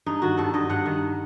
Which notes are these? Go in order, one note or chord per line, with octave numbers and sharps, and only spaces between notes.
G2 D#4
D#3 F#4
G2 A4
G2 D#5
G2 F#5
D#3